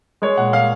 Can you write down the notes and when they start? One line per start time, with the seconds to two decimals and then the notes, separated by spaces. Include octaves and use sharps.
0.22 G#3 C#5
0.37 A#2 F#5
0.53 G#3 F5